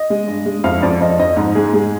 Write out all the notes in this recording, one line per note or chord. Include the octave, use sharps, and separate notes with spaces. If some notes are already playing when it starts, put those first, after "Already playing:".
Already playing: D#5
G#3
G2
G#3
F2 F5
F2 D5
F2 D#5
F2 D#5
G#2
G#3 G#4
G#3 G#4